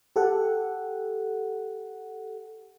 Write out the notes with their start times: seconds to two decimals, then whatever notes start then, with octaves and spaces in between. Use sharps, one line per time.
0.16 G4 A4 F#5